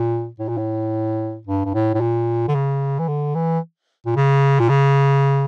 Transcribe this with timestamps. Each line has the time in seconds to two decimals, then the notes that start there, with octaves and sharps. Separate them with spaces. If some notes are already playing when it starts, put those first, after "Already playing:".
Already playing: A#2
0.39 A2
0.48 A#2
0.58 A2
1.47 G2
1.65 G2
1.74 A2
1.94 A2
2.00 A#2
2.48 D3
2.55 C#3
2.99 E3
3.08 D3
3.35 E3
4.06 A#2
4.16 C#3
4.59 A#2
4.69 C#3